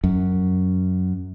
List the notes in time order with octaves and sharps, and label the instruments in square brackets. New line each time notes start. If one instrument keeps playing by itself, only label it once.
[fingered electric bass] F#2